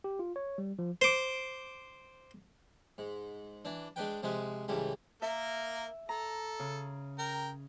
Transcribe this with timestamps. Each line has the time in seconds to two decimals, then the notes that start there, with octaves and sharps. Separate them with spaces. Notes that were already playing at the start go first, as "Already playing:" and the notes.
0.04 G4
0.19 F4
0.36 C#5
0.58 G3
0.79 F3
1.02 C5 D6
2.98 G#2
3.65 E3 D4
3.96 G#3 D4 B4 G5
4.23 C3 F3 G#3 G#4 B4
4.68 C#2 A2 C#3 E3 G3 A3
5.22 A#3 A#4 E5
6.09 A4 A#5
6.59 C#3
7.19 A#4 G5